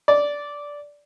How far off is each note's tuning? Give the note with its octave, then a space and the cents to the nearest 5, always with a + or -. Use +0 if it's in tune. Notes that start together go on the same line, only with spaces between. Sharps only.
D5 -10